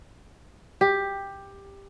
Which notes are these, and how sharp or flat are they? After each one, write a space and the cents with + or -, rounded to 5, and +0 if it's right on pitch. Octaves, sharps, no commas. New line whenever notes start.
G4 +10